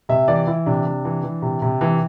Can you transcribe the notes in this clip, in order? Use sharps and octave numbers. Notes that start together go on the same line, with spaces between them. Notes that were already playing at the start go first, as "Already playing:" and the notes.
C3 E5
E3 D5
E3 E4
C3 D4
C3
E3
E3
C3
C3
E3